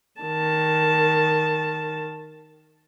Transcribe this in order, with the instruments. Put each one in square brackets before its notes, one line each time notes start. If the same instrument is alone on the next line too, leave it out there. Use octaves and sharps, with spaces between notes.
[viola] D#3 A5